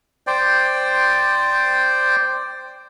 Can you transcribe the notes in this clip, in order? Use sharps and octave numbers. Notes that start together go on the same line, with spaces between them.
C5 D5 G5